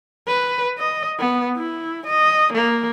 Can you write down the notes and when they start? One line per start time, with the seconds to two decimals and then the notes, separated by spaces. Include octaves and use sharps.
0.28 B4
0.79 D#5
1.19 B3
1.57 E4
2.07 D#5
2.53 A#3